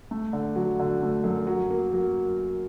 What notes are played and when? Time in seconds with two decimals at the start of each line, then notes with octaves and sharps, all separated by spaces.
0.11 A3
0.33 D3
0.56 F#3
0.79 D3
1.02 A3
1.24 F#2
1.47 F#3
1.70 A#3
1.93 F#3